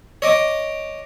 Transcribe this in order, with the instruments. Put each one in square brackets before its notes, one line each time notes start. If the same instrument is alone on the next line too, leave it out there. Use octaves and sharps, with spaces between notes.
[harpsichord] C#5 D#5 D6